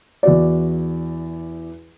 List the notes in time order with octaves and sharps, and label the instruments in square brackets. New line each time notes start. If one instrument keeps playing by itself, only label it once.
[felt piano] E2 F#4 D5